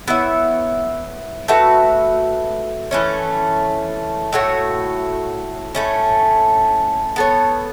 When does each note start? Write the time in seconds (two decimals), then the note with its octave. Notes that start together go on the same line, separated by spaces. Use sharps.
0.08 B3 E4 C#5 E5
1.48 A3 F#4 B4 E5
2.91 E3 A3 C#4
4.33 A2 A3 F#4 C#5
5.75 A2 A3 C#4
7.16 B3 A4 C#5